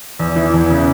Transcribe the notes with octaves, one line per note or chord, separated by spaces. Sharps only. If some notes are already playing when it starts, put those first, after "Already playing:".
E2
E3
E2
C#3